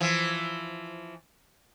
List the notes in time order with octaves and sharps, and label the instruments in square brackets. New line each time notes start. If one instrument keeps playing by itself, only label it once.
[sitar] E3 F3